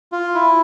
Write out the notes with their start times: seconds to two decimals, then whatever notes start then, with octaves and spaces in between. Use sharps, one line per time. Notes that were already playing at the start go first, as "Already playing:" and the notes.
0.12 F4
0.35 E4